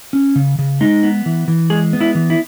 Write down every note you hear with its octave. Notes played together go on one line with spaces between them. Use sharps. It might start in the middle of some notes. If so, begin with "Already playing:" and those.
C#4
C#3
C#3
G#3 D#4
B3
E3
E3
G#3 G#4
B3
E4
E3
E4